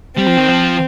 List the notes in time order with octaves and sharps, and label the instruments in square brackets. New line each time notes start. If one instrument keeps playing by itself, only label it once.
[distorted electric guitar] G3 [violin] C4
[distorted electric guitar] F3
D#3
F3